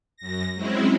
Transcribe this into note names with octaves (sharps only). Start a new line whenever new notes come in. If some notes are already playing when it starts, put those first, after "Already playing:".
F#2 A#6
F#3 G#3 C4 C#4 E4